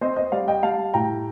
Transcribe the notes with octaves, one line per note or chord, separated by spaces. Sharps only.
C4 C5 D#5
C5 D#5
G3 D5 F5
D#5 G5
G3 F5 A5
A2 G5 A#5